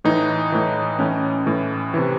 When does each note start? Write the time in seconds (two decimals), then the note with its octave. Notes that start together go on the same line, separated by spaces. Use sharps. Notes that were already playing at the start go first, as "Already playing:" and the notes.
0.04 A2 E3 D#4
0.52 A2 E3
0.99 A2 E3 C#4
1.46 A2 E3
1.94 C3 E3